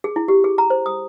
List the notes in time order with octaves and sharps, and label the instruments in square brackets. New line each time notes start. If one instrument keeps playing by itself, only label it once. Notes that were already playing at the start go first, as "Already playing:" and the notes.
[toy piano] G#4
E4
G4
G#4
A#5
C5
D#6